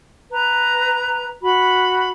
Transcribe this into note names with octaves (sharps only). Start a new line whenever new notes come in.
B4 A#5
F#4 B5